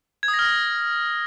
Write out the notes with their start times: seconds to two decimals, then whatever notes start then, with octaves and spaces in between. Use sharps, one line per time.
0.23 G#6
0.28 D#6
0.34 A#6
0.39 F6
0.44 A#6